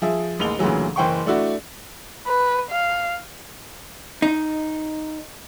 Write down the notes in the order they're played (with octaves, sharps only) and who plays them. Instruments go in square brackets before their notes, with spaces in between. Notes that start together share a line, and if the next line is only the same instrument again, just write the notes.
[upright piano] F3 G#4 E5
A1 D#2 G#3 F7 G7
D2 A#2 C#3 E3 F#3
F#1 E3 C5 G5 C6 C#6
A3 D4 E4 F#4
[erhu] B4
F5
[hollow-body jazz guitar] D#4